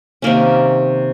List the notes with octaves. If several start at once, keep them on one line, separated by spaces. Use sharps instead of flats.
C3 D#3 A#3 C#4